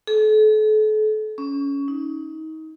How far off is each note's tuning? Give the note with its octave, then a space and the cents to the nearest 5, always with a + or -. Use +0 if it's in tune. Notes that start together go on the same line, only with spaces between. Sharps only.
A4 -40
C#4 +15
D#4 +30